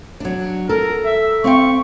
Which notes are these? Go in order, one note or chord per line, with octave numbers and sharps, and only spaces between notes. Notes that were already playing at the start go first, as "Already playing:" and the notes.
F#3 D4
A4 A#4
E5
C4 F5 G5 C#6